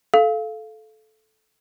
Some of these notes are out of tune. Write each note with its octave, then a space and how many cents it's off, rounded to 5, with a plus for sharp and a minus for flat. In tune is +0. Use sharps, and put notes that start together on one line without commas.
A4 -15 F5 -5